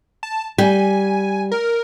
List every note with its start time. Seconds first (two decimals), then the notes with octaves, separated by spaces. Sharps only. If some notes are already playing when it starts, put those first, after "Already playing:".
0.23 A5
0.58 G3 G#5
1.52 A#4